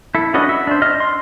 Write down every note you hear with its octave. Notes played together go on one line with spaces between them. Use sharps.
E4 A4
C#4 D4 F#4 B4 D#5
E5
D4 C5
D#5 F6
C6